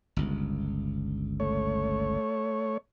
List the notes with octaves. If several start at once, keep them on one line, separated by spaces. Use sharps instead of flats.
G1 C#2
A3 C#5